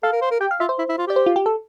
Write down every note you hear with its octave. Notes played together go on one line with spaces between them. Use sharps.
A4 F5
A#4
C5
A#4
G4 G5
F5
F4 E5
C5
E4
E4
F4
G4 D5
C5
F4
G4
A4